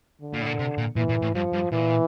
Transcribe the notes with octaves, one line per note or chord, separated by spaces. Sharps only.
D3
A#2
A2
A#2
C3
A#2
A#2 E3
A#2
A2
G2 F3
G2
A#2 E3